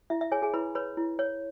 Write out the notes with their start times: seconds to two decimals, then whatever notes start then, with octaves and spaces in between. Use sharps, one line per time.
0.10 E4 E5
0.21 E5
0.32 G#4 C#5 G#5
0.42 G#4 G#5
0.54 E4 B4 B5
0.75 B4 C#5 B5
0.97 E4
1.19 C#5